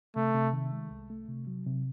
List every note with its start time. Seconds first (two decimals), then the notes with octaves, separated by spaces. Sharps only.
0.16 C3 A3
0.34 C3
0.53 D#3
0.72 G#3
0.90 C2
1.10 A3
1.29 C3
1.47 F#3
1.67 C3